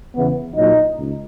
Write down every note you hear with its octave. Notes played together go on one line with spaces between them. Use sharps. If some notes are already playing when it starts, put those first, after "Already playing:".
E2 C#3 E3 B3
A#1 A#2 F#3 D#4
C#2